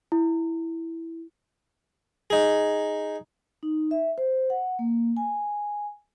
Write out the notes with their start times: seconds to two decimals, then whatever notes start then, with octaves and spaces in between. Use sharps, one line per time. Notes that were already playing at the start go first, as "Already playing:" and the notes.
0.12 E4
2.30 D#4 G#4
3.63 D#4
3.91 E5
4.18 C5
4.50 F#5
4.79 A#3
5.17 G#5